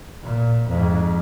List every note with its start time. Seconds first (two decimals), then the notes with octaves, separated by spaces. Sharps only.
0.23 A#2
0.68 F2 G#2